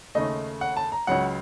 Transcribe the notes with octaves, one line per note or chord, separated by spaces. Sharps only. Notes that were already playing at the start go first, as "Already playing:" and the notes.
D#2 C#3 A3 D#5
F#5
A5
A#5
C#2 C#3 F#3 F#5